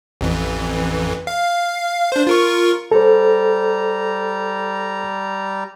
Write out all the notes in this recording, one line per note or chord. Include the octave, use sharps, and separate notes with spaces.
A1 F2 E3
F5
D4 C5
F4 A#4 C#6
G3 A4 C5 A#5